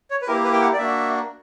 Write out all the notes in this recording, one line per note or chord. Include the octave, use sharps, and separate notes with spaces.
C#5
B4
A#3 E4 G4 A#4
B4
G5
F#5
D5
A#3 D4 F#4 E5